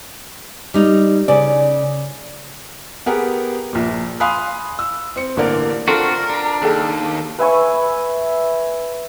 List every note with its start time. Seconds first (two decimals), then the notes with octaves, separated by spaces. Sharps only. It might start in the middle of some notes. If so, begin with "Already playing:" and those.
0.74 G3 D#4
1.28 C#3 D5
3.06 B3 G4 G#4 A#4 F#5
3.73 A#1 A#2
4.20 F5 G#5 B5 C6 D#6 F#6
4.79 E6
5.16 C4 C#7
5.37 A1 D3 A#3 A#4 D5
5.88 C4 D4 F4 F#4 A4 A#4
6.29 D4
6.62 D#2 G#4 A4 G5
7.39 B4 E5 G#5 C#6